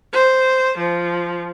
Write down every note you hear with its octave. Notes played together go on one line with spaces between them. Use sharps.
C5
F3